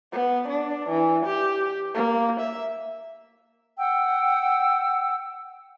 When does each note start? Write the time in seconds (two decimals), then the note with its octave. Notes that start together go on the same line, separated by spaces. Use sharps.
0.12 B3
0.48 D4
0.89 E3
1.26 G4
1.94 A#3
2.40 E5
3.78 F#5 G5 E6